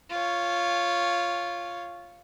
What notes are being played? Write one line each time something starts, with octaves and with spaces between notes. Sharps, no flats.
F4 C#5